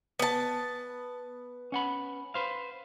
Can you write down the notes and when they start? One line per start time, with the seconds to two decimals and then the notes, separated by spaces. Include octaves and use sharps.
0.19 B3 A5
1.72 C#4 F#5 B5
2.34 B4 C5 F5